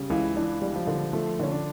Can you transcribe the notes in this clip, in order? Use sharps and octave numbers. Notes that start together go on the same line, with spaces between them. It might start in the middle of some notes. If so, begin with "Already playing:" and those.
Already playing: C#3 G3
C#2 E3
E3 D4
G3
F3
D3
F3 A3
D3 C#4
D4